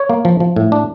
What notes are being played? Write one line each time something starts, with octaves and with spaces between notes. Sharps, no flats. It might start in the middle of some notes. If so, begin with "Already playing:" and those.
Already playing: C#5
A#3
F3
F3
A2
D4